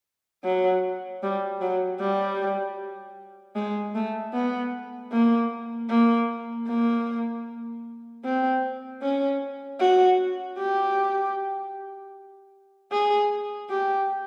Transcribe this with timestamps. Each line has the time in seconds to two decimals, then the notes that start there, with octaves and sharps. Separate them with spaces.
0.45 F#3
1.23 G3
1.62 F#3
2.00 G3
3.56 G#3
3.95 A3
4.34 B3
5.12 A#3
5.90 A#3
6.68 A#3
8.24 C4
9.02 C#4
9.80 F#4
10.58 G4
12.92 G#4
13.70 G4